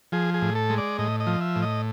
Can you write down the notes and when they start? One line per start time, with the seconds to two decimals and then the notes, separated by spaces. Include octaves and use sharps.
0.12 F3 G#4
0.34 G#4
0.42 A2
0.55 A4
0.70 G#3
0.78 D5
0.99 A2 D#5
1.20 D#5
1.27 F3
1.41 E5
1.56 A2
1.62 D#5